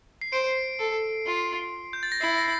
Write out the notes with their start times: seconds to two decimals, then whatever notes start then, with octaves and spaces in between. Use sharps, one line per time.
0.21 C7
0.33 C5 D7
0.79 A4
1.26 F4
1.93 G6
2.03 A6
2.12 A#6
2.21 E4 C7
2.38 A#6
2.44 C7